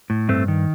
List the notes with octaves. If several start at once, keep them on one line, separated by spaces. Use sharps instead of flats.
A2
G2 A3 C4
D#3